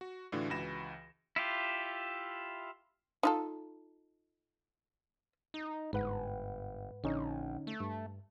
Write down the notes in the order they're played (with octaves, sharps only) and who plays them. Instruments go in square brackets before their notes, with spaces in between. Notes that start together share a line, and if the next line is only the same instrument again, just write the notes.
[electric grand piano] F#4
A2 D3 E3 D4 F4 F#4
C#2 E3 F#4 B5 A#6 E7
[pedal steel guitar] E4 F4 G4
[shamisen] D#4 F4 A4
[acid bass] D#4
[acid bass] G1 [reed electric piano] G#2 B4 F#5
[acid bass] A#1 [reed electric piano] D3 C#4 D#4
[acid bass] A3
[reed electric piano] G2